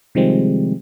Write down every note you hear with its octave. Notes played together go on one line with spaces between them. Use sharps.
C3 D#3 F3 G3 G#3 C4